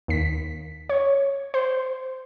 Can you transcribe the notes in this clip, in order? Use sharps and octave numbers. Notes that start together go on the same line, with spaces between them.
D#2 B6
C#5
C5